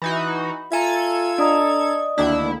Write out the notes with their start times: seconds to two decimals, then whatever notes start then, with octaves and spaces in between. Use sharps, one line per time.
0.02 E3 D#4 F#4 B5
0.72 F4 A4 E5 G#5 A#5 G#6
1.38 D4 D5 D#5 A#5 D#6
2.18 D2 D#3 A#3 D4 E4